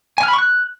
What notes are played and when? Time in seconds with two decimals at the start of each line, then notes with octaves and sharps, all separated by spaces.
0.18 G#5
0.23 F6
0.28 B5
0.33 C#6
0.38 F#6